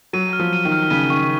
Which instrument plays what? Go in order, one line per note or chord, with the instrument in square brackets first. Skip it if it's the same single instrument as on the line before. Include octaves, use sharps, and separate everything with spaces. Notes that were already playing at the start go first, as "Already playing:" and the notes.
[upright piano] F#3 [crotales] D#7
[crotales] F6
[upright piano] F3
[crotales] D#7
[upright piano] D#3
[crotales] F6
[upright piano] C#3 [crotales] D#7
[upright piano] D#3 [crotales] C#6